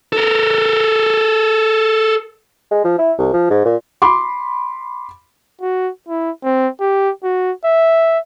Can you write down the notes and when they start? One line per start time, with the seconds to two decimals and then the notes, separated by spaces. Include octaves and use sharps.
0.13 A4 A#4
2.71 G#3
2.84 F3
2.98 E4
3.18 C2
3.33 F3
3.50 G#2
3.65 A#2
4.02 B5 C6 D6
5.61 F#4
6.08 E4
6.44 C4
6.80 G4
7.23 F#4
7.65 E5